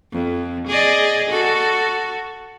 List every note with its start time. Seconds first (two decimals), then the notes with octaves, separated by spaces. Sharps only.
0.12 F2
0.67 G#4 D5 D#5
1.30 F#4 A4